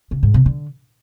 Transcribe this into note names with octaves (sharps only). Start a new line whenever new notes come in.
C#3
G#2
C3
D3